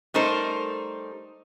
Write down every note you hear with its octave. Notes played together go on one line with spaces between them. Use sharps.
G3 A3 D#4 A#4 C5